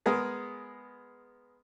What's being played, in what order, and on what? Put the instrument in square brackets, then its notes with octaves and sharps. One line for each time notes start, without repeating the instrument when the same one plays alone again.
[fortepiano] G#3 B3 G#4 A#4